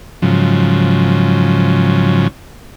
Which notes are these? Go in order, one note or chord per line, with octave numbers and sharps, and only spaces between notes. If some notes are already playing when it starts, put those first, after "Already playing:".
G#2 C#3 F3 F#3